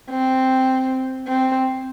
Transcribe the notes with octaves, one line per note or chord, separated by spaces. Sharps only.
C4
C4